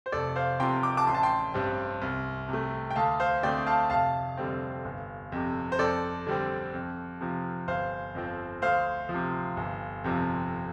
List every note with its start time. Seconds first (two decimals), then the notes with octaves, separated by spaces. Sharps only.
0.06 C5
0.12 F1 A4 D5
0.36 C5 F5
0.60 F2 C3 F3 G5 C6
0.83 D6
0.97 A5 D6
1.07 A1 C6
1.15 A5
1.23 G5 C6
1.54 G2 G3 C4
2.02 C2
2.49 C3 A3
2.91 G5
2.96 D2 F5 A5
3.20 C5 F5
3.43 D3 A3 C4 D5 G5
3.67 F5 A5
3.90 F1 F5 A5
4.37 F2 D3 G3 C4
4.85 G1
5.32 F2 C3
5.72 C5
5.79 F2 A4 D5
6.27 D3 G3 C4
6.74 F2
7.21 C3 F3
7.67 G1 C5 F5
8.15 F2 F3 C4
8.62 D2 C5 F5
9.09 F3
9.14 C3
9.57 G1
10.04 F2 C3 F3